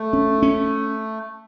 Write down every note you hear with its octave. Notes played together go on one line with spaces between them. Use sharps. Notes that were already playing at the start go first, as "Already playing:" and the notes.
Already playing: A3
C#4
C#4